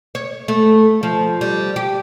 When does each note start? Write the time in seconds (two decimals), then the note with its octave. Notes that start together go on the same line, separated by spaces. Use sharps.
0.15 C#5
0.48 A3
1.03 F3
1.41 G3
1.76 G4